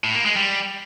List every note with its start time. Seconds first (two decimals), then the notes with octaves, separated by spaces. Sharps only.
0.04 A2
0.15 A#3
0.25 G#3
0.36 G3